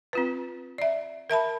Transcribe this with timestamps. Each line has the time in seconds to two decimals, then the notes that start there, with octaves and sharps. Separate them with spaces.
0.13 C4 F4 B4
0.78 D5 E5
1.30 A#4 E5 A5 B5